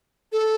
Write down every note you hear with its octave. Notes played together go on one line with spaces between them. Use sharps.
A4